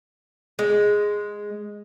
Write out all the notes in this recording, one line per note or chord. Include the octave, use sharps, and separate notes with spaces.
G#3